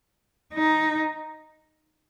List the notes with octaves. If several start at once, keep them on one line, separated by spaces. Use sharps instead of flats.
D#4